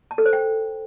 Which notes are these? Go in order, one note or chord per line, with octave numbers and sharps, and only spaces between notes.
A5
A4
C5
G5